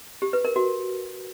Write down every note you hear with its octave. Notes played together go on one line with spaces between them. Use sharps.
G4
B4
A#4
F#4